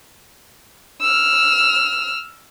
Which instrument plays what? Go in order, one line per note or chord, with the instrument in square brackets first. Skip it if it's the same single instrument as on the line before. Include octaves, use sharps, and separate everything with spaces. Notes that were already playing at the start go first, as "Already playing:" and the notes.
[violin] E6 F6